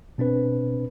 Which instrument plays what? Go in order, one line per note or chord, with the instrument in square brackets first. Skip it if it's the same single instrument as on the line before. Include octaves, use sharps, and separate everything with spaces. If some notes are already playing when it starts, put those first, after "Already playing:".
[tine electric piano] B2 C4 D4 B4